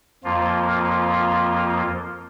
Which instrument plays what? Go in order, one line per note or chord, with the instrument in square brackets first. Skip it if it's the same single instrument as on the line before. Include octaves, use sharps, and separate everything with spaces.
[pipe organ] F2 F3 A#3 F4